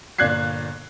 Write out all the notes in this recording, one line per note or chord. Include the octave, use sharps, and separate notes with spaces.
G1 A#2 D5 F#6 G#6 C7